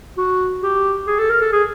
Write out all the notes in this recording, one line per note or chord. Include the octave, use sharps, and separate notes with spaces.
F#4
G4
G#4
A4
A#4
A4
G#4